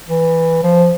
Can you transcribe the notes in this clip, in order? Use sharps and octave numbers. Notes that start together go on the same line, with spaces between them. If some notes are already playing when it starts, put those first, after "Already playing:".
E3
F3